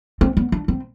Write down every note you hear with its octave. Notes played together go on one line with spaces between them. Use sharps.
C4
B3
D4
C4